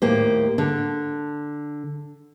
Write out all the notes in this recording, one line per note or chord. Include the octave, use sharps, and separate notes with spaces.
D#2 A2 A#3 G4 C5
D3